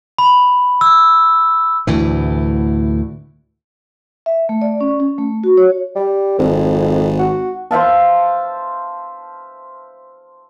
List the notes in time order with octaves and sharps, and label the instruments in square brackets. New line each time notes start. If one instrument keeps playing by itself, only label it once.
[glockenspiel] B5
E6
[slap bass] D2 A2 E3
[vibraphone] E5
A3
D5
C#4
C#4
A3
F#4
C#5
[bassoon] G3
[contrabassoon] G#1 [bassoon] F2
[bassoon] F#4
[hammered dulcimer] C5 E5 F5 A5